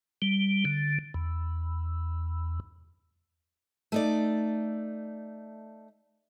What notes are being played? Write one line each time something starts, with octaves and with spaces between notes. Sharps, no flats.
G3
D3
E2
A3 D#4 D5